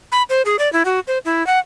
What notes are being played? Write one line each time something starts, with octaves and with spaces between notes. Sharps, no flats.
B5
C5
G#4
D5
E4
F#4
C5
E4
F#5